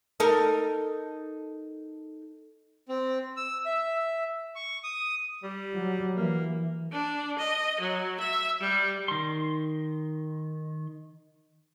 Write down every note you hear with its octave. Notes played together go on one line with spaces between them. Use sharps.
D#4 A4 A#4
C4
E6
E5
C#6
D#6
G3
F#3
E3 A#3
D4
D#5
F#3
E5
G3
D#3 C6